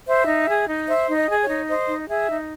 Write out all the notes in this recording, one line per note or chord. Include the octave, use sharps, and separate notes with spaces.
C5 E5
D#4
G#4
D#4
C5 E5
D#4
D#5
G#4
C#5
D#4
C5 D#5
D#4
G#4 E5
D#4